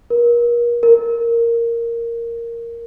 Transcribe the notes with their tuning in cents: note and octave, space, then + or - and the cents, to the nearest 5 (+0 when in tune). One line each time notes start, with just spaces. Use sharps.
A#4 +35
A#4 -5